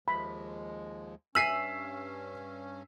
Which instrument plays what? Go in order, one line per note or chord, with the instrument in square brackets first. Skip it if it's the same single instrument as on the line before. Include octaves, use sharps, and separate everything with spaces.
[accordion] D#2 F3 G#3 [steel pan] B5
[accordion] G2 C#4 [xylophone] E5 G#5 F#7 [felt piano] E6 B6 C7